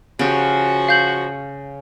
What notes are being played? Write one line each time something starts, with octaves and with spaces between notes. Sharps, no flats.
C#3 F3 F#4 G4
F5 G6 F#7